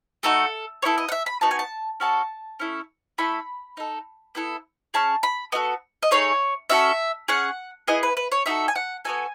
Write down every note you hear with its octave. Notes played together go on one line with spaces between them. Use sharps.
A3 D#4 F#4 A4
B3 E4 A4 C#5
D#5
F#5
E5
B5
B3 D#4 F#4 A5
G#5
A5
C#4 F#4 A4 A5
C#4 E4 A4
A3 E4 A4 B5
D#4 A4
B3 E4 A4
C#4 G#4 A5
B5
B3 F#4 A4 D#5
D#5
A3 D#4 G#4 C#5
C#4 F#4 A4 E5
C#4 G#4 F#5
B3 E4 G#4 D#5
B4
B4
C#5
D#4 F#4 A4 E5
G#5
F#5
B3 F#4 A4 G#5